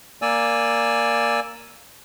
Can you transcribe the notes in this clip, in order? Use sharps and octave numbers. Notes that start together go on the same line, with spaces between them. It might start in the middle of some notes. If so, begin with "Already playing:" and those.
A#3 D5 G#5 E6